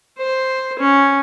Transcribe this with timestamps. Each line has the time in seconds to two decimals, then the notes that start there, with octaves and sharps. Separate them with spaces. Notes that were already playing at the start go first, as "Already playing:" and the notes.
0.18 C5
0.79 C#4